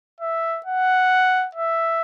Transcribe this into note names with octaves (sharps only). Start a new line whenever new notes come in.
E5
F#5
E5